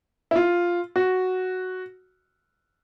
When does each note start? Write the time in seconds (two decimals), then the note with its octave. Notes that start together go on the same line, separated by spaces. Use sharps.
0.31 E4
0.36 F4
0.96 F#4